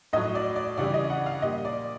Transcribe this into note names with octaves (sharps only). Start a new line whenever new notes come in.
A2 F#3 D#5
D5
D5
C#3 E3 G3 D5
D#5
F#5
F5
A#2 G3 D#5
D5